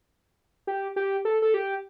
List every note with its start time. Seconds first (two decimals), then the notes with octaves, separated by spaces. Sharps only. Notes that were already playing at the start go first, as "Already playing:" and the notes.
0.67 G4
0.96 G4
1.25 A4
1.42 A4
1.54 G4